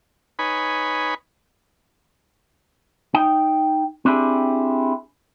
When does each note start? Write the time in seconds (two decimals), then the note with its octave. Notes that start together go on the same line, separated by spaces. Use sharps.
0.39 D#4 B4 C#5 G#5 B5
3.15 D#4 G5
4.05 C4 D4 E4 G4 G#4